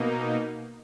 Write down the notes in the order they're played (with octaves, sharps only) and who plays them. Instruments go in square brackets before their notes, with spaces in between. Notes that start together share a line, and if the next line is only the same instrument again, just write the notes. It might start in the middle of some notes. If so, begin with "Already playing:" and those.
Already playing: [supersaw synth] B2 A#3 D#4